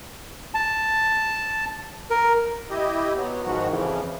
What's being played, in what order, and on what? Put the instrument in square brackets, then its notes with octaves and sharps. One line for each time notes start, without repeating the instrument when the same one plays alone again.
[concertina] A5
A#4
[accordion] E4 G4 D#5
F#3 B3
G#2 D#3 F3 F#4
F2 C#3 E3 F3